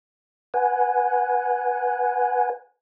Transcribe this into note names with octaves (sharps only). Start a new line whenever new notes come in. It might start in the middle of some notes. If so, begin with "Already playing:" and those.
B4 F#5 G#5